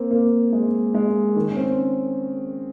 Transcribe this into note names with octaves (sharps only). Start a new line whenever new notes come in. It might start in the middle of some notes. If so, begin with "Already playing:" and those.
Already playing: A#3 C4
A#3
G#3
G#3
D#3
C#4
C4